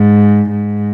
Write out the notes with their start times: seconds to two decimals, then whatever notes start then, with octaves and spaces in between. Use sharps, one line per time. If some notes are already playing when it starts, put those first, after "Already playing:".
Already playing: G#2
0.50 G#2